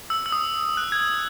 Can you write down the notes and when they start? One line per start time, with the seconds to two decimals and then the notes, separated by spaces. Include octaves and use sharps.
0.10 E6
0.26 E6
0.32 D#6
0.77 F#6
0.92 G#6
1.07 E6